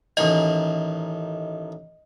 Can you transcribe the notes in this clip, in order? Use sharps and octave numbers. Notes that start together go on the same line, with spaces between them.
A1 D#3 D#5 G#5